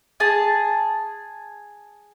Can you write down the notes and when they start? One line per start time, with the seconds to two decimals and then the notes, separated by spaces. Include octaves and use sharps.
0.20 G#4 A5